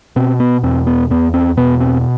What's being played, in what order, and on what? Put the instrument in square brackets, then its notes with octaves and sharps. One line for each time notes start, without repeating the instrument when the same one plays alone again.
[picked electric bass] B2 C4
B3
E2 C4
B3
E2 B3
C4
B2 B3
C4